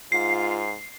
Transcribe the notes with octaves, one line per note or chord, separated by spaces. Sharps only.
G#2 F4 C7